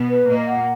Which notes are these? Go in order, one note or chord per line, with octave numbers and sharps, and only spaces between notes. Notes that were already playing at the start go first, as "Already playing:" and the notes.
Already playing: B2 B3
B4
A#2 A#3 D#5
F#5